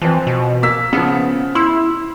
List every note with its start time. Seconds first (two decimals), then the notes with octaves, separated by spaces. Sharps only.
0.02 E3 F3 C4
0.27 B2
0.63 A#3 E6 B6
0.93 C#3 F3 B3
1.55 E4 C6 E6